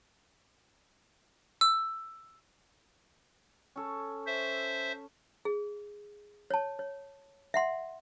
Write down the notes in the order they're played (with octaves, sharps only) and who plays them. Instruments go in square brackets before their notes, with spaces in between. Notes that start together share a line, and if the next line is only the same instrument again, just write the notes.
[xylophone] E6
[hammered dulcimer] C#4 A4
[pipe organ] C5 E5
[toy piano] G#4
C#5 A5
C#5
E5 F#5 C6